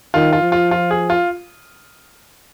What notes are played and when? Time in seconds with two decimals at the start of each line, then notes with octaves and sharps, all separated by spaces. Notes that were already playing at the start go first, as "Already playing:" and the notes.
0.14 D#3 F4
0.33 F4
0.42 F3
0.52 F4
0.71 F4
0.91 G#4
1.10 F4